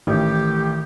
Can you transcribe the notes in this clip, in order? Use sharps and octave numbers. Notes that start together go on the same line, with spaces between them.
A1 D#3 G4